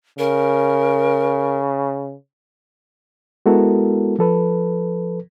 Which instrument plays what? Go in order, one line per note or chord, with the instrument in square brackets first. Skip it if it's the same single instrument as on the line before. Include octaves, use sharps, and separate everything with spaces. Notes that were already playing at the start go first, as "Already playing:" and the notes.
[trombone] C#3 [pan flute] A#4
[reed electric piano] G#3 B3 E4 F#4 A4 A#4
F3 A4 B4